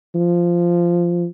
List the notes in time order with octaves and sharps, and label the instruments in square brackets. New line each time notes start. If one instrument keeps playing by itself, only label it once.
[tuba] F3